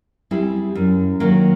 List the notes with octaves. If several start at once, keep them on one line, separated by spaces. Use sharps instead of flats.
G3 C4 E4 G#4
F#2
D#3 F#3 A#3